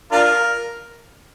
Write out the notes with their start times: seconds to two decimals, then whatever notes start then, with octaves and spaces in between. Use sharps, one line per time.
0.12 D4 F4 A#4